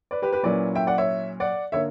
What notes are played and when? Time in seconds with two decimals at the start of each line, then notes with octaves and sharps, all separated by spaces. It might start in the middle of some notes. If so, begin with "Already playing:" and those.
0.11 B4 D5
0.22 G4 B4
0.33 G4 B4
0.43 A#2 F#3 C#4 E4 B4 D5
0.75 E5 G5
0.87 D5 F#5
0.98 C#5 E5
1.40 D5 F#5
1.72 D3 A#3 C#5 E5